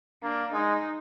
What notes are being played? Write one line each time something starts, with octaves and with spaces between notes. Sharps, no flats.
A#3 D4
G#3 D#4